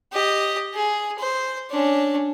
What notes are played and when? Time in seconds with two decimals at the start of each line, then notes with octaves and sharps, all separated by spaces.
0.13 G4 D#5
0.75 G#4
1.19 C5
1.71 C#4 D4